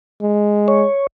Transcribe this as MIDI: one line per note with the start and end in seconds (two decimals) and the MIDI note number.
0.21 0.85 56
0.68 1.07 73